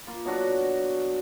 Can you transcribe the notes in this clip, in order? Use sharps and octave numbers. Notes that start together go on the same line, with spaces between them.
A#3 F4
B2 F#3 D4 F#4